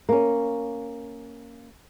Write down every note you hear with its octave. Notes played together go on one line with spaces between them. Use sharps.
A#3 C#4